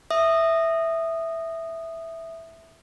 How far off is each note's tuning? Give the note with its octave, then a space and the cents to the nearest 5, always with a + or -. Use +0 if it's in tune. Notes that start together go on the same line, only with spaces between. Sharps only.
E5 +0 D#6 -15